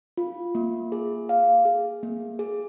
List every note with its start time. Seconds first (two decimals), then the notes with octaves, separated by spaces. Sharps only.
0.17 F4
0.55 A#3
0.92 G#4
1.29 F5
1.65 G#4
2.03 A#3
2.39 G#4